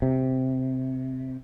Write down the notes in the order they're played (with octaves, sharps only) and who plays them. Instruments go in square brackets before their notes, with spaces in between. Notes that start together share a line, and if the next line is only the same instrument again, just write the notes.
[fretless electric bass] C3